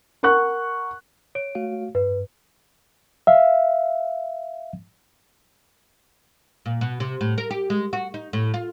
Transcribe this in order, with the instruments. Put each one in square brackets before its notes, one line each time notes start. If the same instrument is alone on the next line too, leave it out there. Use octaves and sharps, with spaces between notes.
[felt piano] A#4 F#5 C#6 F#6
[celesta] C#5 D7
[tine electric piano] A3 F#4 F5
[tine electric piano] G2 [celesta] B4
[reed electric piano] E5 F5
[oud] A#2
B2
C3
A2
A#4
G4
G#3
F#4
D#4
A2
F4